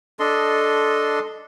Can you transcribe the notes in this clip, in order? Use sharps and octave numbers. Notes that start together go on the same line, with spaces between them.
D4 A4 D#5 C6